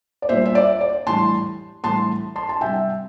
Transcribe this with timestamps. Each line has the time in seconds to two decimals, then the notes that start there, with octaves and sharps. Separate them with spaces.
0.22 D5
0.29 A#2 G3 C5 E5
0.46 E5
0.55 D5
0.81 D5
1.07 A2 E3 G3 A5 C6
1.84 A2 E3 G3 A5 C6
2.36 A5 C6
2.49 A5
2.61 C3 G3 E5 G5